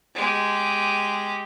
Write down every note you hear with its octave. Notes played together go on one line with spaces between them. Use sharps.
G#3 G4